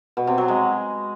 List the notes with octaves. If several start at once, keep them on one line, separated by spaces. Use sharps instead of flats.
B2
C3
F#3
G#3